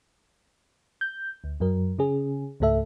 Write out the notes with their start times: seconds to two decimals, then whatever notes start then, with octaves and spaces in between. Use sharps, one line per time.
1.01 G6
1.44 D2
1.60 F#2 F#3 A#4
1.98 C#3 C#4 G#4
2.60 C#2 G#2 A3 A4 E5